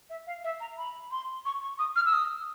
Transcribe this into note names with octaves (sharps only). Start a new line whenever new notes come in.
E5
F5
E5
A#5
B5
C6
C#6
C#6
D#6
F6
E6
D#6